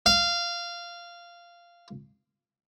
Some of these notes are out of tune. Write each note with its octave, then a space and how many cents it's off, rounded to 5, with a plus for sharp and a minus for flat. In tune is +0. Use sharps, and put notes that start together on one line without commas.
F5 -15